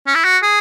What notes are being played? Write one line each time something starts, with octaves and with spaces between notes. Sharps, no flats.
C#4
E4
F#4
G#4